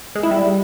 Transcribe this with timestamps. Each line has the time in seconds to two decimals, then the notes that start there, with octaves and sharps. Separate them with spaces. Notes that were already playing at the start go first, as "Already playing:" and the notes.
0.15 G#3
0.23 E4
0.31 G3